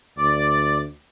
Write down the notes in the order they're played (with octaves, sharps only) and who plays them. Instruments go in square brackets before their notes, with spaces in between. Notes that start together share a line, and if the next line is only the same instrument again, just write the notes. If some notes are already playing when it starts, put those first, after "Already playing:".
[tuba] D2 [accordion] D5 D6